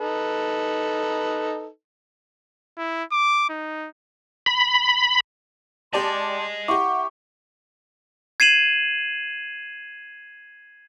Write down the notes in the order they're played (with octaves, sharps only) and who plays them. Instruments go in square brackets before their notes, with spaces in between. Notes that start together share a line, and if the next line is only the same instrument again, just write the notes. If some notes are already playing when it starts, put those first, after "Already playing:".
[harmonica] D#4 A4 B4
[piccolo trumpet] E4
D6
D#4
[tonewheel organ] B5
[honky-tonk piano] G4 D5 A5 [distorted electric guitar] D#5 G#5 [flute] C6
[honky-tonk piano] E4 G4 [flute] F#5 [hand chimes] C#6 D6
[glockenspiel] G#6 C7 D#7 E7 F#7